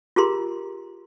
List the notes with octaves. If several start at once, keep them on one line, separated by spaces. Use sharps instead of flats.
F4 G4 G#4 A#4 A#5 C6